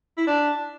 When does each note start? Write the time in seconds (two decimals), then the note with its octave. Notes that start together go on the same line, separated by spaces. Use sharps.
0.17 E4
0.27 D4